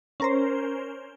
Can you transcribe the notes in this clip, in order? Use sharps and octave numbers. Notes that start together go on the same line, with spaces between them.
C#4 A#4 C5